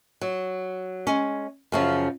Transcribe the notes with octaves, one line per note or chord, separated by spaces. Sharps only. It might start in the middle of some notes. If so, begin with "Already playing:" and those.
F#3
G#3 C#4
F#2 C#3 F3